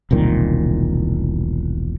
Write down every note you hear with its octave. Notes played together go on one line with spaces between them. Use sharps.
E1 C2 A#2 D#3